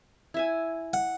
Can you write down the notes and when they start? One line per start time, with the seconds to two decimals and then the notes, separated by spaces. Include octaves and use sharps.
0.34 E4 E5 G#5
0.93 F#5